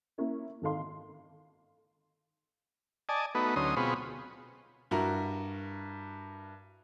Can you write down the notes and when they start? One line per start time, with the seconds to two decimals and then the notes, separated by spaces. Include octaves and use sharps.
0.18 A#3 C#4 E4 A#4
0.62 G#1 D#3 A4 D#5 F5 C6
3.09 D5 D#5 G#5 A5
3.35 A3 B3 D#4 F#4 B4
3.56 D2 F#3 C#4 D#4 C6 D#6
3.76 B2 G#3 C4 F4 B5 C#6
4.91 G2 E4 F#4 A#4 A#5